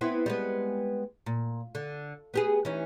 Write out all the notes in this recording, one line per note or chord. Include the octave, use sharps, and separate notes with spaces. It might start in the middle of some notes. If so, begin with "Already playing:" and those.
B3 C4 E4
G3 G#3 B3
A#2
D3
B3 G4 G#4
E3 C#4 D#4